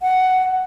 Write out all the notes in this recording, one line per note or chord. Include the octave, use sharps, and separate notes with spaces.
F#5